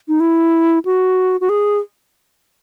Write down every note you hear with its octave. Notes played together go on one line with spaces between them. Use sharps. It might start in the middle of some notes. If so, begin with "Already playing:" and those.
D#4
E4
F#4
F#4
G#4